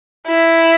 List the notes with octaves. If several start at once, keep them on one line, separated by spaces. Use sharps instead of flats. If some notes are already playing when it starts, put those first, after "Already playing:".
E4